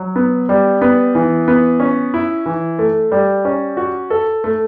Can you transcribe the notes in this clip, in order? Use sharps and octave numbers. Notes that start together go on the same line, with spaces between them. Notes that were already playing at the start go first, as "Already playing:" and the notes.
Already playing: F#3
B3
G3
B3
E3
B3
C#4
E4
E3
A3
G3
C#4
F#4
A4
A3